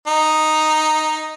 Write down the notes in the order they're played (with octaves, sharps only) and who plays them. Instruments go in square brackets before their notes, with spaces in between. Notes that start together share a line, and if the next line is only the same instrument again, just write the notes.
[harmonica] D#4